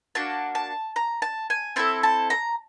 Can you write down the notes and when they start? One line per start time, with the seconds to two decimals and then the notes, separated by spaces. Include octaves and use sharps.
0.15 A#3 D4 F#4 A5
0.55 A5
0.96 A#5
1.22 A5
1.50 G#5
1.76 C4 E4 A4 A5
2.03 A5
2.30 A#5